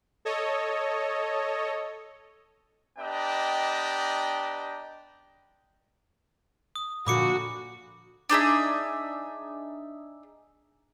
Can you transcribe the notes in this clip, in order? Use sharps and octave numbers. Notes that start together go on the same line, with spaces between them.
A4 C#5 D#5
B3 D4 G4 D#5 G5 A#5
D#6
A#2 D3 F3 F#4 B5 D6 C#7
D4 D#4 G#4 E5